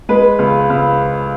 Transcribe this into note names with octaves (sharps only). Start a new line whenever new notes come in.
G#3 B4
C#2
C#2